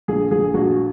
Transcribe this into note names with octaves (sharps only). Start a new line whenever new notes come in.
A#1 G#4
A#1 G#4
A#1 F#4